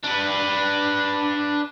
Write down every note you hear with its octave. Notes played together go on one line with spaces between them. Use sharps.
D4 B4